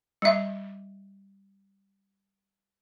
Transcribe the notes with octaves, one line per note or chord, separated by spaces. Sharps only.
G3 E5